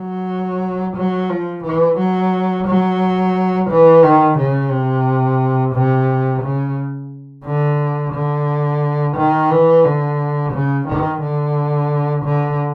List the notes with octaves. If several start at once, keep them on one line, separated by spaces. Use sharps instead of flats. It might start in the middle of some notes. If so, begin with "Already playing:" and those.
Already playing: F#3
F#3
F3
E3
F#3
F#3
E3
D#3
C#3
C3
C3
C#3
D3
D3
D#3
E3
D3
C#3
D#3
D3
D3